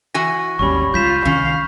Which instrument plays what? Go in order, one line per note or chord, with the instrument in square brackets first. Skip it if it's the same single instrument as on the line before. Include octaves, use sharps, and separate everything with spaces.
[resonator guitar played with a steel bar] E3 F#4 G#5 [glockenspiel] A#6
[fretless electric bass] G#1 D#2 [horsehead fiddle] G3 C#4 [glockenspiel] B5 C#6
[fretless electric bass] C#2 G3 [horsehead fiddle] F4 [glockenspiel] G6 B6 E7
[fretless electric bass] C2 D#3 [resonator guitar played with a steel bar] C#4 [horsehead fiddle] F5